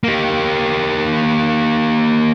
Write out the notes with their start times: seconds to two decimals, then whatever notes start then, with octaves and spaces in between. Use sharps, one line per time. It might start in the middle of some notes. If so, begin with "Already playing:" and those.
0.04 A#3 G4